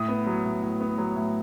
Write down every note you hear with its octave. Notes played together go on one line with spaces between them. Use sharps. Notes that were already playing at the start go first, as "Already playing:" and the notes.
Already playing: A2 D#6
B3
F#3
A2
A2
B3
F#3
A2